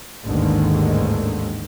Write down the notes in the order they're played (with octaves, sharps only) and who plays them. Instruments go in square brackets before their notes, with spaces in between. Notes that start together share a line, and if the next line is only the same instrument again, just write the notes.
[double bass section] A1 D#2 G#2 D3 D#3 G#3